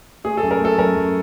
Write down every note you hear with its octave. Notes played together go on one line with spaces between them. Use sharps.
A3 G#4
A4
F#2
A#4
A3 A4
F#2 A#4
F#2